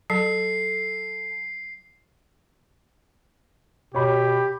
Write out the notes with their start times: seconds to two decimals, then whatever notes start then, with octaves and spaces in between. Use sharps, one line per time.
0.10 F#3 A4 C7
3.95 B2 G4 C#5 B5